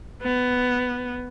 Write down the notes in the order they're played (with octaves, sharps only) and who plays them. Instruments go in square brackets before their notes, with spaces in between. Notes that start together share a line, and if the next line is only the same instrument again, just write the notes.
[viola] B3